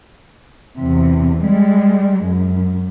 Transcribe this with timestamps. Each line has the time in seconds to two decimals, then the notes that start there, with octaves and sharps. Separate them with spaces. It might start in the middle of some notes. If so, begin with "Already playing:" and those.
0.80 E2 C3
1.46 G3 G#3
2.26 F#2